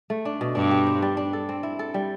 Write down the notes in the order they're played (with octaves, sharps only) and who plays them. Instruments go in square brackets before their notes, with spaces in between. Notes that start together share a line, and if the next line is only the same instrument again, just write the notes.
[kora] A3
D4
B2
[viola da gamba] G2 [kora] D4
[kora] G4
C5
G3
D4
A4
C4
E4
A4
G3